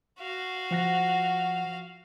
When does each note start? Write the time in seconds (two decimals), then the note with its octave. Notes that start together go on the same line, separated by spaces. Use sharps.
0.19 F#4 F5
0.71 F3 F#5 A#6